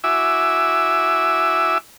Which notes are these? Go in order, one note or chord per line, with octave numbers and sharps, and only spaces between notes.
E4 F#4 E5 G#5 D6 E6